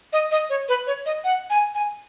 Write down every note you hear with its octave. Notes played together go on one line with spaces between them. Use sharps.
D#5
D#5
C#5
B4
C#5
D#5
F#5
G#5
G#5